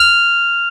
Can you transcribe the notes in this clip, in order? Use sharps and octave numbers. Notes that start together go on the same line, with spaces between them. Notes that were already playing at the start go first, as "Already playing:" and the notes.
Already playing: F6 F7